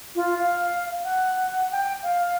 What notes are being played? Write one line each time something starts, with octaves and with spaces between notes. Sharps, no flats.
F4
F5
F#5
G5
F5